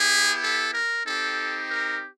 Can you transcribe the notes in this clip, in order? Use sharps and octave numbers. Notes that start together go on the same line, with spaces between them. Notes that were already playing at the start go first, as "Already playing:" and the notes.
Already playing: B3 E4 G4 G#4
A4
A#4
C4 D#4 G4 A4
A#4